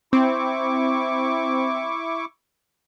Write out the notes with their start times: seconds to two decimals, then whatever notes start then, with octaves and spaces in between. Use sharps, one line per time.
0.13 C4 E4 C#6 D6